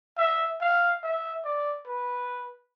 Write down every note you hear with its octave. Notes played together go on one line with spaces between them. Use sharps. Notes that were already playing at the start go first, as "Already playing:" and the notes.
E5
F5
E5
D5
B4